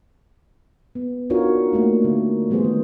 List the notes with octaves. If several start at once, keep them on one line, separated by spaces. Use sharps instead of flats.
B3
D4 D#4 F4 F#4 A#4 C#5
A3 A#3 D4
D3
E3 G3 A3 B3 G#4 C5
D#3